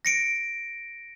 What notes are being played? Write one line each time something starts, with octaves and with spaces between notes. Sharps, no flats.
A#6 C#7 D7